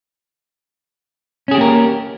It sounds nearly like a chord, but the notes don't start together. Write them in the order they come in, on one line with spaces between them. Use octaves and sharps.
C#4 G#4 G4 A#3 A#4